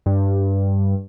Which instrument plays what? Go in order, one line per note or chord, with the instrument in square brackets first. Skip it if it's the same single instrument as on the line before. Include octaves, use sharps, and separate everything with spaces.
[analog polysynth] G2